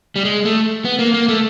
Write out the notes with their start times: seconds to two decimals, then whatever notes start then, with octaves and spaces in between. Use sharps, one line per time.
0.16 G3
0.25 G#3
0.45 A3
0.85 B3
0.99 A#3
1.14 A#3
1.28 A3